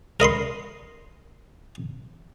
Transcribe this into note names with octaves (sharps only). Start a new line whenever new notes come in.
A#4 D#5 B5 C6